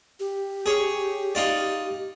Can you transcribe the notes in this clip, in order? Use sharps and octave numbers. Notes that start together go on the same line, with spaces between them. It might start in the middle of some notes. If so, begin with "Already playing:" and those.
G4
G#4 C#5
D#4 F4 D5